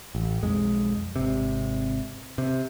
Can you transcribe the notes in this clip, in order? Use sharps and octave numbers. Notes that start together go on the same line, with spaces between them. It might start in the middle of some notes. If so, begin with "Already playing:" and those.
A1
B1 F2 G#3
G#1 C3
C3